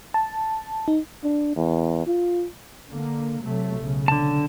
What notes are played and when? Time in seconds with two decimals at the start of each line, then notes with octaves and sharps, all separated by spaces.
0.14 A5
0.88 D#4
1.24 D4
1.56 E2
2.07 F4
2.91 D3 A#3
3.43 C3 F#3 A3
3.77 B1 C#3
4.08 D3 A5